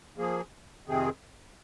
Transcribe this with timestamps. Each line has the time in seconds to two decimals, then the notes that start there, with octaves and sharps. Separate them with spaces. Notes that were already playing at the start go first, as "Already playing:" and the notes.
0.18 F3 A#3 G#4
0.86 F2 C3 D#3 C4 G#4